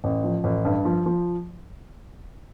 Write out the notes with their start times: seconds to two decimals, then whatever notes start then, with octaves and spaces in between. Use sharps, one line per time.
0.04 A1
0.24 F3
0.44 A1
0.65 G2
0.85 F3
1.06 F3